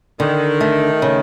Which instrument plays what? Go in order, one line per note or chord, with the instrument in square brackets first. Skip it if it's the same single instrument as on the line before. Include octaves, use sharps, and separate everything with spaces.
[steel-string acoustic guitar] D3 [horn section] D#3
[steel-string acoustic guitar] A3
C#3